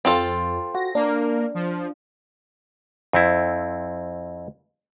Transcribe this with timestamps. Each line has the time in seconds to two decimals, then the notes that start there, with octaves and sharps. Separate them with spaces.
0.05 F2 C4 F4 A4
0.75 F#4 A#6
0.95 A#3 D4 A#4
1.54 F3
3.13 F2 C4 E4